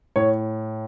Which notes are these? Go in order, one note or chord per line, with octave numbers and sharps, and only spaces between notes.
A2 C#5